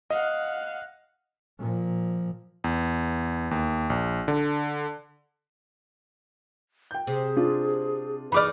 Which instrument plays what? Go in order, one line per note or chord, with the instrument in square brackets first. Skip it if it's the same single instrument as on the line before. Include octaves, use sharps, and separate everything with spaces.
[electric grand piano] D#5 [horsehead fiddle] F5 F#5
[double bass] A#2 F3
[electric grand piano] E2
D#2
A#1
D3
[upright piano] G5 G6
[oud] C3 [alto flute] G#4
[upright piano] D4 F4
[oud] E3 D#4 D5 [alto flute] G#4 [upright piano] B5 D6 F6